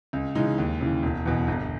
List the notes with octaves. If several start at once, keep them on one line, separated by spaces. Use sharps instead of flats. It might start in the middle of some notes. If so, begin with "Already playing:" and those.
C#2
C#3 E3 G#3 D#4
D#2
C#3 E3
E1
E2 B2
G1